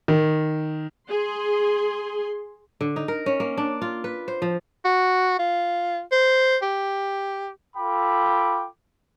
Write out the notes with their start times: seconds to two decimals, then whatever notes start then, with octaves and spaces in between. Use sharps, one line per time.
0.08 D#3
1.09 G#4 C6
2.81 D3
2.96 D#4
3.08 A#4
3.26 C#4
3.40 A#3
3.57 D4
3.82 F4
4.04 B4
4.28 C5
4.42 F3
4.85 F#4
5.39 F4
6.12 C5
6.62 G4
7.77 F4 A4 G5 B5 D6